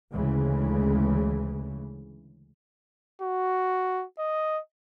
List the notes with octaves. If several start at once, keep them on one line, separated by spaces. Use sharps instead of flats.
D2 C#3 E3 G#3
F#4
D#5